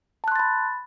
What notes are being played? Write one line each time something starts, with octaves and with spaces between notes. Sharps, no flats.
A5 B5 C6 F#6 A6